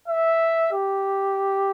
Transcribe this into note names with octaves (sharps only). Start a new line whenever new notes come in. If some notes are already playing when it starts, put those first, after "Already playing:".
E5
G4